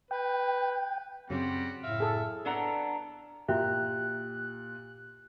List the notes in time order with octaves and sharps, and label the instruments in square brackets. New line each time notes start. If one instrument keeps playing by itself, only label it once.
[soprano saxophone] B4 [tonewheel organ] G5
[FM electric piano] F#2 C#3 [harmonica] G3 F#4 F#5 [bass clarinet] C4
[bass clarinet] A2 [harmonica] E5 F5
[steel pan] G#4 A4
[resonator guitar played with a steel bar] F#3 B3 D4 A4 F#5 A#5
[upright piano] A#2 [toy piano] E4 F#4 E5 [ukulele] G4 [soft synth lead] F#6